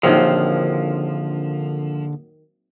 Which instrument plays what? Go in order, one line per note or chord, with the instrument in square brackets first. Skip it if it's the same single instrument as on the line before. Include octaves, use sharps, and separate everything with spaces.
[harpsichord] A#1 [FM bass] D3 [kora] D#3 F#3 C4 [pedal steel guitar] F3